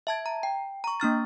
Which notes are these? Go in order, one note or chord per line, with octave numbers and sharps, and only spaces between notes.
E5 A5 G#6
A#5
G5
A#5 C#6
A#3 D4 F6 A6